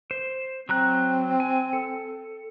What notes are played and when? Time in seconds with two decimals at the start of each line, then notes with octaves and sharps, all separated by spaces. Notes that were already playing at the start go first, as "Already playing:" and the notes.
0.11 C5
0.69 F#3 C4 A#5 F#6
1.40 G#5
1.73 A4